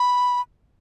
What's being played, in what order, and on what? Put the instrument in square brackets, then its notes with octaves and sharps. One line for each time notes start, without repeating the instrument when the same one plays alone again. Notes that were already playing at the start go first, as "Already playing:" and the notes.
Already playing: [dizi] B5